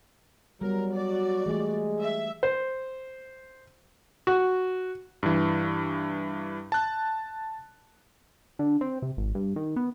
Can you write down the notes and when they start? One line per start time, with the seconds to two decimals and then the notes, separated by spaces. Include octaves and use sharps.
0.61 F#3 G3 B3 A#4
0.94 F#4 D5
1.46 E3 G#3 A3 G4
2.00 E5
2.43 C5
4.27 F#4
5.23 G2 E3
6.72 A5 F#6
8.59 D3
8.81 C4
9.02 C3
9.17 G#1
9.35 G2
9.56 D#3
9.76 B3